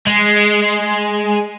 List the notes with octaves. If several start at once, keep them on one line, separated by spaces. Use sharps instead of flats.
G#3